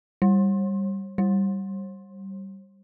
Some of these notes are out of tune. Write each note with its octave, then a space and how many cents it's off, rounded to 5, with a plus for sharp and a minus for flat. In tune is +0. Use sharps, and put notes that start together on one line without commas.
G3 +0
G3 -10